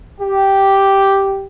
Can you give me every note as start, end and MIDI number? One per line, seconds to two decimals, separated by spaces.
0.20 1.47 67